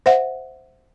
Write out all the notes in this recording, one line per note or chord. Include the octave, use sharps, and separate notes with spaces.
C5 E5 F#5